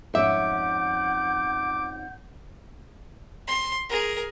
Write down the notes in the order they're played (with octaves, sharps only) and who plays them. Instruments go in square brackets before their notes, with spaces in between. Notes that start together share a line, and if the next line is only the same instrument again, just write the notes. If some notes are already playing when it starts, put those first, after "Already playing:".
[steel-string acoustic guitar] F2 G#2 C#4 [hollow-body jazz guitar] E5 [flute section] F#5 G6 [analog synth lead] D6
[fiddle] C6
G#4 A#4